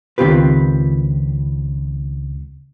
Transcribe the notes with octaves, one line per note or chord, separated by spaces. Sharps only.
C#2 D#3 C4 F4 G4 B4